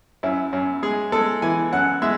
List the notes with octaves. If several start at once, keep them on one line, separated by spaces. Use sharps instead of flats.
F#2 E4
F#2
G#3 G#4
G#3 A4
E3 G#5
F#2 F#5
G#3 E5